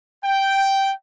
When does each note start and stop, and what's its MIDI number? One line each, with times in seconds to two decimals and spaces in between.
0.24 0.91 79